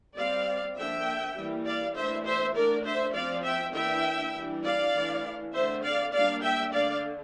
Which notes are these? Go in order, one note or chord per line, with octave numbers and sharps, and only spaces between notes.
G3 C4 D5 F5
D3 F3 A#3 D4 E5 G5
E3 G3 A#3
D5 F5
E3 A3 D4 C5 E5
C5 E5
D3 A3 D4 A#4 D5
C5 E5
F3 C4 D5 F5
E5 G5
E3 A#3 D4 E5 G5
E3 G3 D4
D5 F5
E3 A3 D4
D3 A3 C4 C5 E5
D5 F5
G3 A#3 D4 D5 F5
E5 G5
D3 A3 D4 D5 F5